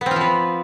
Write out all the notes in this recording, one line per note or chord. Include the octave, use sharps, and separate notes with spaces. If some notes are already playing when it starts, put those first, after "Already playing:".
F3 B3 C4 F4 B4